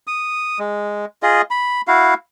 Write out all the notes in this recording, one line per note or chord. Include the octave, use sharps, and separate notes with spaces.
D#6
G#3
F4 G#4 D#5
B5
E4 F#4 F5